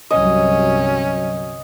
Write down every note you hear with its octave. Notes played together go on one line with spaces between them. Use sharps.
G1 C2 F#3 C#4 D#5